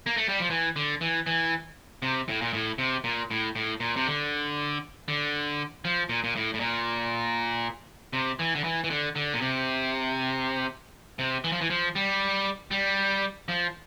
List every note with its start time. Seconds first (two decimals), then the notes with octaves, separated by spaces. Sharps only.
0.06 A#3
0.17 A3
0.29 G3
0.40 F3
0.50 E3
0.76 D3
1.01 E3
1.27 E3
2.02 C3
2.29 A2
2.42 A#2
2.53 A2
2.78 C3
3.04 A#2
3.31 A2
3.56 A2
3.80 A#2
3.96 C3
4.06 D3
5.08 D3
5.85 F3
6.09 A#2
6.24 A#2
6.36 A2
6.54 A2
6.60 A#2
8.13 C3
8.39 E3
8.55 D3
8.64 E3
8.84 E3
8.90 D3
9.16 D3
9.34 A#2
9.41 C3
11.19 C3
11.44 E3
11.52 F3
11.61 E3
11.70 F3
11.96 G3
12.71 G3
13.49 F3